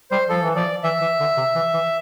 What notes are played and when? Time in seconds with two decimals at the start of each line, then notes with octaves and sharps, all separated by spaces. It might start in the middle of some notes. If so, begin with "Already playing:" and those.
0.11 G3 C5
0.29 F3 A4
0.42 E3
0.55 F3 D5
0.83 E3 E5
1.01 E3
1.20 D3
1.37 C3
1.55 E3
1.73 E3